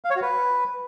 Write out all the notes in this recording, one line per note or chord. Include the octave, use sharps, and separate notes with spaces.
F5
C#5
F#4
B4